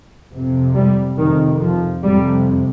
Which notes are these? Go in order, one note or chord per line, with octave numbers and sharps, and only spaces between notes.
F2 C3
G3
F2 C3 D#3
F3
F2 C3 G3